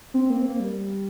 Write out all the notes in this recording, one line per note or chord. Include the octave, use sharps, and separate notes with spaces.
C4
A#3
C4
A#3
G3